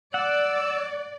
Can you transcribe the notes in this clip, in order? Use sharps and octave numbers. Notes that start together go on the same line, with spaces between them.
D5 F#5 E6